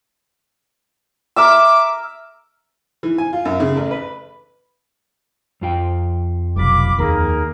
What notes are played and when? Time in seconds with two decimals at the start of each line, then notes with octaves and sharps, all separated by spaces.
1.36 A#4 E5 D6 E6
3.03 E3
3.18 G#5
3.33 F4
3.45 F#2
3.60 C#3
3.77 A1
3.91 B4
5.61 F2 F4 G5
6.56 F1 B1 F5 B5 D6
6.99 D#2 A#3 G#4 A#4